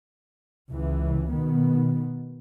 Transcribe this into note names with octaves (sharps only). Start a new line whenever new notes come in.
C#2 E3
B2 D#3 B3